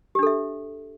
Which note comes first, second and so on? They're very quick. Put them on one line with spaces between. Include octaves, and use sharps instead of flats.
G4 D4 A4 E5